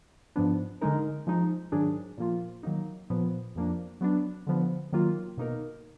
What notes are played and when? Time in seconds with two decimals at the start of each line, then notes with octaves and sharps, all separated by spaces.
0.36 G#2 F3 B3 D4
0.81 D3 G#3 D#4 A#4
1.27 F3 G#3 D#4
1.72 G#2 D#3 F#3 D4 G#4
2.18 A#2 F3 A#3 F4
2.63 D#3 F#3 A#3 D#4
3.10 A#2 F3 B3
3.55 F2 F3 A#3 D4
4.01 F#3 B3 D4
4.47 D3 F3 B3
4.93 D#3 F#3 A#3 F4
5.37 B2 A#3 D#4 A#4